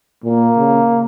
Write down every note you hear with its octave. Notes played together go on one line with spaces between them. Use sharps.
A#2 A#3
C#3